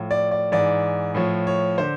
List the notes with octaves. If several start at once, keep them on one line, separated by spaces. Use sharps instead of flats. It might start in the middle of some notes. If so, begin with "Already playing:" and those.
Already playing: A2 F3
D5
D5
G#2 E3 D5
A2 F3 C#5
C#5
D3 C5